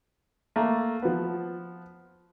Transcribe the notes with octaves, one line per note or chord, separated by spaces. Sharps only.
A3 A#3
F3 B3